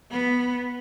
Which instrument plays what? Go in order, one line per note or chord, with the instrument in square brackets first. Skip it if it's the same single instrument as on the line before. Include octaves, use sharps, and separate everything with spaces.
[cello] B3